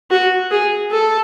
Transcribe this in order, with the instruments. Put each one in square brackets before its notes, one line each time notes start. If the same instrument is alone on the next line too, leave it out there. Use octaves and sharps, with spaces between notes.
[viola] F#4
G#4
A4